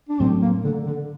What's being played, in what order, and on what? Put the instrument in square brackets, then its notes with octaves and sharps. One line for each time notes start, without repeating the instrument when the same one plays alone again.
[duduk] D4
[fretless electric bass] A2 F#3 A3 [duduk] C4
[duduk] A#3
D3
D3